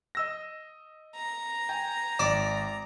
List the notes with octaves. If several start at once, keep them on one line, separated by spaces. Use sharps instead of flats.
D#5 E6 A#6
A#5
G5 G#5
G#1 D5 E7